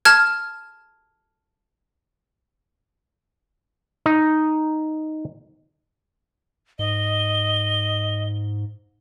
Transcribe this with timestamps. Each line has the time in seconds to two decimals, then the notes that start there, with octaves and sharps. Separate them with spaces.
0.05 A5 F6 G#6
4.06 D#4
6.79 G#2 D#5 G7